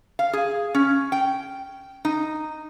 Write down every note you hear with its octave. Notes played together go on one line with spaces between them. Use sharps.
F5
G#4
C#4
G5
D#4